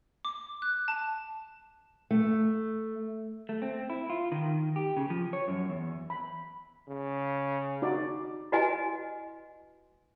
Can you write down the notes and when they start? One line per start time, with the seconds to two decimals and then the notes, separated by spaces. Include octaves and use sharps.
0.25 D6
0.62 F#6
0.88 A5
2.11 A3
3.49 A3
3.62 C4
3.90 E4
4.10 F4
4.32 D#3
4.76 G4
4.97 C#3
5.10 F3
5.33 C#5
5.48 F#2
5.69 E2
6.10 B5
6.88 C#3
7.82 D#4 F#4 D5
8.52 E4 F#4 B4 D#5 F#5 G#5